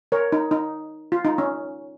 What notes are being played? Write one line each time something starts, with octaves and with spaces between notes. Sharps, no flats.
A#4 C#5
D#4
D#4
F4
D#4
C#4